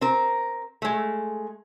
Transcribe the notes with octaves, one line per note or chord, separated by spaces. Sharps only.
C4 A#4
G#3 A3